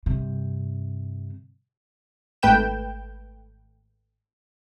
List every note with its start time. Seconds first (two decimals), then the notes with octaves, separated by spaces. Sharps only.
0.06 G2 C3
2.43 G#1 A3 B4 G5 G6 E7